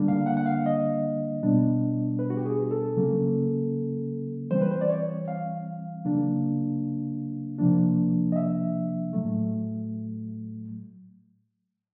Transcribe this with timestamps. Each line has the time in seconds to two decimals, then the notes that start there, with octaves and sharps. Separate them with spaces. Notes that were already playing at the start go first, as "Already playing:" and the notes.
Already playing: D3 G3 A#3 D4
0.08 F5
0.26 F#5
0.37 F#5
0.46 F5
0.66 D#5
1.43 B2 G3 B3 D4
2.19 B4
2.30 F#4
2.37 G4
2.46 G#4
2.71 A4
2.97 C#3 F#3 A#3 C#4
4.51 E3 G3 C4 C5
4.61 B4
4.71 C5
4.81 D5
4.90 C#5
5.28 F5
6.05 C#3 F#3 A#3 D4
7.58 C3 F3 A#3 D4
8.32 D#5
8.36 E5
9.13 A2 F#3 A3